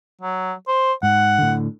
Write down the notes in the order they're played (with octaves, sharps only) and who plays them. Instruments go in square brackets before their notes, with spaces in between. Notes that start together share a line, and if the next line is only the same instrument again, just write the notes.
[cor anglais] F#3
C5
[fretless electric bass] G#2 [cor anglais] F#5
[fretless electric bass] A2 D3